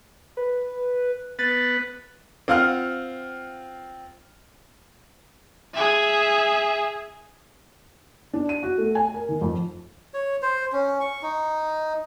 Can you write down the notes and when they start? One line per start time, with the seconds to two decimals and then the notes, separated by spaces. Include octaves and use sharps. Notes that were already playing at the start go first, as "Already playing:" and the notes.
0.37 B4
1.39 B3 B4 A6
2.48 C4 F4 F5 F#5 F6
5.74 G#4 E5
8.33 D4
8.49 D#7
8.63 F#4
8.78 A3
8.95 G#5
9.14 A#4
9.29 D#3
9.41 F2
10.14 C#5
10.42 C5
10.73 C#4
11.00 C#6
11.22 D#4